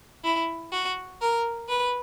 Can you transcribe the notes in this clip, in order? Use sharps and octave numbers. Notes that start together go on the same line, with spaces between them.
E4
F#4
A#4
B4